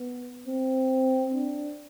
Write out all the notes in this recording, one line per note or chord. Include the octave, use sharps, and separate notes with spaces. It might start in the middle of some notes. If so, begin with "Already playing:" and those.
Already playing: B3
C4
D4